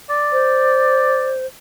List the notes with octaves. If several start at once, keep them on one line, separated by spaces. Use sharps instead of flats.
D5
C5